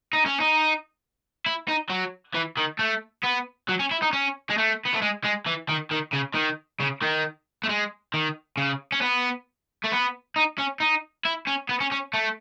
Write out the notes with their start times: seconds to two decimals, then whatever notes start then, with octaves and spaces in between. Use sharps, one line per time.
0.13 D#4
0.26 C#4
0.40 D#4
1.46 E4
1.68 D#4
1.90 F#3
2.35 E3
2.57 D#3
2.79 A3
3.23 B3
3.69 F#3
3.79 C#4
3.91 E4
4.02 D#4
4.13 C#4
4.50 G#3
4.58 A3
4.85 B3
4.94 A3
5.02 G#3
5.24 G#3
5.46 E3
5.69 D#3
5.91 D#3
6.13 C#3
6.35 D#3
6.80 C#3
7.02 D#3
7.64 A3
7.69 G#3
8.14 D#3
8.57 C#3
8.92 C#4
9.02 B3
9.84 A3
9.91 B3
10.36 D#4
10.58 C#4
10.80 D#4
11.25 E4
11.47 C#4
11.69 B3
11.81 C#4
11.92 C#4
12.14 A3